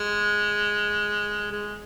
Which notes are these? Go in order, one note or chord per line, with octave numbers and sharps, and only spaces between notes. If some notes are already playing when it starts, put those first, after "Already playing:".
Already playing: G#3
G#3